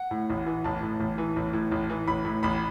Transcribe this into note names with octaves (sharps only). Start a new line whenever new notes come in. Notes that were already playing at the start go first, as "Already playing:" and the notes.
Already playing: F#5
A2
A1
E3
A1 A5
A2
A1
E3
A1
A2
A1
E3
A1 B5
A2
A1 B5